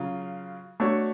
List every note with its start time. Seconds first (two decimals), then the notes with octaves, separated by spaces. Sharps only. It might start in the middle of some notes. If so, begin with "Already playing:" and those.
Already playing: C#3 F#3 F4
0.80 A3 D4 F#4 C#5